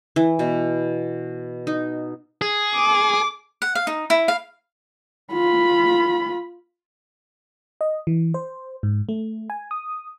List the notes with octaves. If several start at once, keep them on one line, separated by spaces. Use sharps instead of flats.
E3
B2
D#4
G#4
D6
F#5
F5
D#4
E4
F5
F4 B5
D#5
E3
C5
G#2
A3
G#5
D#6